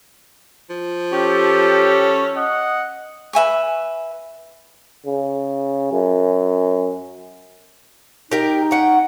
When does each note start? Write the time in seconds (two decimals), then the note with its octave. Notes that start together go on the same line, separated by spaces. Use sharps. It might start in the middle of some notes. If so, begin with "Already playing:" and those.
0.70 F3
1.12 C#4 G4 A4
2.36 D#5 F#5
3.33 B4 E5 G#5 C#6
5.06 C#3
5.92 F#2
8.32 D#4 G4 A#4 G5
8.71 C#4 F#5 G5